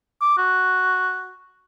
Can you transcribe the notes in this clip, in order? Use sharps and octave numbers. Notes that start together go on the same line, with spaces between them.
D6
F#4